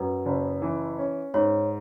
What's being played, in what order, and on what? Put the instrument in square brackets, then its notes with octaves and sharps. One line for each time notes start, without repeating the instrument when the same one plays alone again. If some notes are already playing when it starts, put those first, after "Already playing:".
Already playing: [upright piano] F#2 [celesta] B4
[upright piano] F#1
E3
C#4
[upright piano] G#2 [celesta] C#5